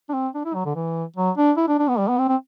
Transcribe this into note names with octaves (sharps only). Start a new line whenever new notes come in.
D4
C4
D4
E4
F#3
D3
E3
F#3
D4
E4
D4
D4
B3
G3
B3
C4
C4